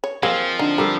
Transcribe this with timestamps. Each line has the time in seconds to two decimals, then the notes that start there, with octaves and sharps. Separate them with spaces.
0.04 C#5
0.23 F3 A#3 C4 G#4 D#5
0.59 D3 D#4
0.78 G3 G4 A4 A#4